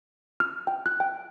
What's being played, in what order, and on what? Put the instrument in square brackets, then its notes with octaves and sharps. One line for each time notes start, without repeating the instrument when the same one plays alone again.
[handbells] F6
G5
F#6
G5